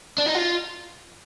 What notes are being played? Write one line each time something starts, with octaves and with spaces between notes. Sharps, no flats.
D4
D#4
F4